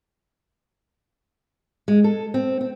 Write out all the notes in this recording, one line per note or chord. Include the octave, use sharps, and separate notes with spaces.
G#3
A4
C4
C4